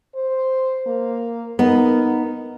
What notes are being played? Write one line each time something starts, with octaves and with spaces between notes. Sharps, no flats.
C5
A#3
B3 D#4 A#4